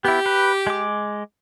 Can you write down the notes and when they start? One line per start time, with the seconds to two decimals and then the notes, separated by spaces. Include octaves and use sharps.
0.05 B3 E4 G4
0.26 B4
0.67 G#3 D6